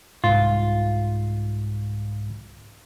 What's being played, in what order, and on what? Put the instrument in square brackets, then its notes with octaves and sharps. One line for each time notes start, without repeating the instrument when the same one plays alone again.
[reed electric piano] C2 G#2 [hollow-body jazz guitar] F4